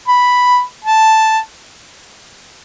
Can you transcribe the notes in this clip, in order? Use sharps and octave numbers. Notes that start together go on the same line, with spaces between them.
B5
A5